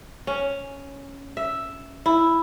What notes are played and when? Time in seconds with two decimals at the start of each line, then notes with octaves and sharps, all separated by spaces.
0.27 C#4
1.37 E5
2.06 E4